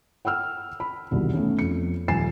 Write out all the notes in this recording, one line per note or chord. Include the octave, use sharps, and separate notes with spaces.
F#5 G5 E6 F6
B5
E1 C2 B2 D#3
A3 B3 C#4
F2 C#7
D#1 F3 G#5 A6 C7 E7